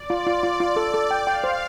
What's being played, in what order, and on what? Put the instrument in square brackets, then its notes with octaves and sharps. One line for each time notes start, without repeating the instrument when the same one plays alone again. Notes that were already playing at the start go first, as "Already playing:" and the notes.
Already playing: [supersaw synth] D5
[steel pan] F4
F4
F4
F4
A4
A4
G5
[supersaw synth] F5 [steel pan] G5
[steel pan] C5